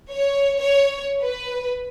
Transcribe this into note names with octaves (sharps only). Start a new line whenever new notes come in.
C#5
C#5
B4